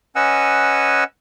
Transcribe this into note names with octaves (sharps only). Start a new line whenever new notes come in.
C#4 B4 D#5 F#5 G#5 E6